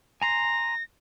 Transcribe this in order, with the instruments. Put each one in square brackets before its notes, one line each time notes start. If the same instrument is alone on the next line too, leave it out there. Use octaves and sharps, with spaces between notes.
[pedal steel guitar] G#5 A#5 C6 [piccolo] A#6